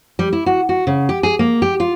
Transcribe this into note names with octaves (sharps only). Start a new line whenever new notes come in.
G3
E4
F#4
F#4
C#3
G4
G#4
A#3
G4
F4